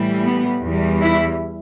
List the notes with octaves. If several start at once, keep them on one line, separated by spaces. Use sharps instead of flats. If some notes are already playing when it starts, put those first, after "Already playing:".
Already playing: A2 E3 G3
B3
E2 E3 G3
E4